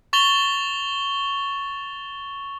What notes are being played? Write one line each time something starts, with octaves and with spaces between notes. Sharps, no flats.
C#6 A6 F7 G7